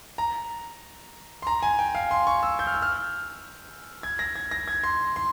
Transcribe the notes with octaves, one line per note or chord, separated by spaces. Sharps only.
A#5
C6
A#5
G#5
G5
F5
C6
C#6
E6
G6
F6
E6
F6
G#6
A#6
G#6
A#6
G#6
C6
C6